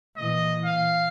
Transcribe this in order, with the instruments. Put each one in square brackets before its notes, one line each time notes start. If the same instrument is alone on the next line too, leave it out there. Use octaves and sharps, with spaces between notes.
[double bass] A#2 E3 [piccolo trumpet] D#5
[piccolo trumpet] F5